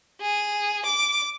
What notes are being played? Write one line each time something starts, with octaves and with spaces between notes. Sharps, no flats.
G#4
D6